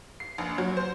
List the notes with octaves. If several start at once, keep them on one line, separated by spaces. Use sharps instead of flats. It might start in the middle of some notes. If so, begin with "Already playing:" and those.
C7
A#1
F#3
C5